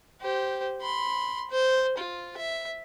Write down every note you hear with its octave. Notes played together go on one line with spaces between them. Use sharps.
G4 C5
B5 C6
C5
F4
E5